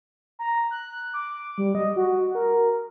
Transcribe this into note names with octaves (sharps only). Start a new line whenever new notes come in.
A#5
F#6
D6
G3
D#5
F#4
A#4